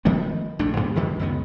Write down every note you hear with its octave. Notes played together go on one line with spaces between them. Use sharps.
D#3 F3 A3 B3
A#1 A3 D4
G2 G3 G#3 B3
E1 D2 D3 D#3
C#2 F#2 D#3 B3